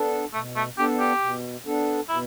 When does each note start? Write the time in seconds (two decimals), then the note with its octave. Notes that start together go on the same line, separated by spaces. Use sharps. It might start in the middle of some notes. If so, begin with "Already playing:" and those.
Already playing: B3 D4 A4
0.34 B2 A3
0.56 A3
0.78 B3 D4 G4 A4
1.00 G4
1.22 B2
1.66 B3 D4 A4
2.09 B2 E4